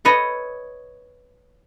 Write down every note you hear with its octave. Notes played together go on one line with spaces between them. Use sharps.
A4 B4 C#5 D#5